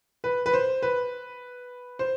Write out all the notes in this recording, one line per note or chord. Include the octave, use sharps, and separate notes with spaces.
B4
B4
C5
B4
C5